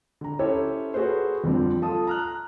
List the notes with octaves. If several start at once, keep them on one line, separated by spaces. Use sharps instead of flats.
D3 A#5
C#4 E4 G4 A4 C5 C#5
F#4 G#4 A4 B4 C5
F2 D3 F3 G3 C4
F4 A4 A5 D#6
A#5 F6 F#6